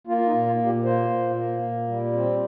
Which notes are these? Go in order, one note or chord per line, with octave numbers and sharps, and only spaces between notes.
A#3 F4
F4
D#4
A#2
F4
A#2
G4
A#3 C5
A#2
A#3
A#2
G3
C4